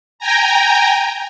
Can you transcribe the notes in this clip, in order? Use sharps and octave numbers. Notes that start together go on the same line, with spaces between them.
G5 G#5 A#5